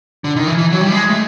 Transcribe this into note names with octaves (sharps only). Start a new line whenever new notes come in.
D3
D#3
E3
E3
F#3
G3
G#3
A3